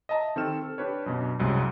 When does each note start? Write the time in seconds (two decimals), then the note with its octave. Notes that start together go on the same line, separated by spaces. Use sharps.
0.09 D#5 E5 A5 A#5
0.36 D#3 C4 G4 A4 F6 E7
0.63 A4
0.78 D4 G4 B4 C#5
1.06 F#2 B2 D4
1.39 C2 F#2 C3 G#3